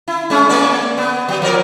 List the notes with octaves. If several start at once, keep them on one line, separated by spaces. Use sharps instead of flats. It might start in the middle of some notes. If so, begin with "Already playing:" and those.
E4
G#3 C#4
A#3 C#4 D5
B3
F#3
F3 A#4 D5